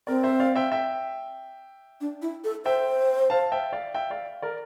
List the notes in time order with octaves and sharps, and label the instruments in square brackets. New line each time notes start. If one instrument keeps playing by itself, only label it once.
[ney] C4 [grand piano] A#4 D5
[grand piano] C5 E5
D5 F5
E5 G5
E5 G5
[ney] D4
E4
A4
[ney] C5 [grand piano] E5 G5
[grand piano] F5 A5
E5 G5
D5 F5
E5 G5
D5 F5
A#4 D5